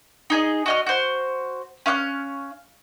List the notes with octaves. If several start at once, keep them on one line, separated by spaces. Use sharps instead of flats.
D#4 G#4 D#5
F#4 D#5 F6
F#4 C5
C#4 F5 C#6 F#6